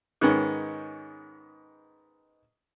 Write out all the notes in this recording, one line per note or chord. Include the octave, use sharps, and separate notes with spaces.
G#2 D#3 G#3 B3 C#4